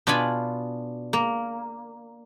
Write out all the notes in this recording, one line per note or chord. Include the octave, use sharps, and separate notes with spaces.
B2 D4 F4 G#5 B5
A#3